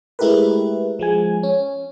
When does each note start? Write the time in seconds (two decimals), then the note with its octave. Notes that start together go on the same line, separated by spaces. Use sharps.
0.19 G#3 A3 E4 G4 A#4 B4
0.99 F3 G#3 G#5
1.43 C#4